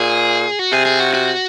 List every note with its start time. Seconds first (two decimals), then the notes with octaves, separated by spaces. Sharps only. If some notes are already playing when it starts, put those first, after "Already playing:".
Already playing: A#2 G#4
0.59 F#4
0.72 C3 G#4
0.85 G#4
1.00 F#4
1.14 F#4